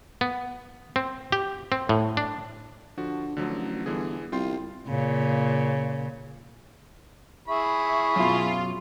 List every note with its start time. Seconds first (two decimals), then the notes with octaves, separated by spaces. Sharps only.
0.21 B3
0.96 C4
1.32 G4
1.72 C4
1.89 A2
2.17 D4
2.97 D3 F3 F#4
3.37 D2 D3 F3 F#3
3.49 A1
3.86 G1 D3 E3 G#4
4.32 C2 F4 G5 C6
4.88 A#2 C#3
7.48 E4 G#4 E5 B5 C#6
8.16 F#2 B2 F4